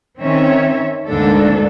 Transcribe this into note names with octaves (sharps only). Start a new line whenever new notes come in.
D#3 C4 C#4 C#5 E5
D2 G#2 D3 A#3 D4 A4